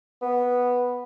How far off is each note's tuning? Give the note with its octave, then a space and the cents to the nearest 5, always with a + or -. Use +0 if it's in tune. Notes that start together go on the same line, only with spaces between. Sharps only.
B3 -5